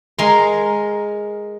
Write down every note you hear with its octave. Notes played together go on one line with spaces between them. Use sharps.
G#3 A#4 G#5 C6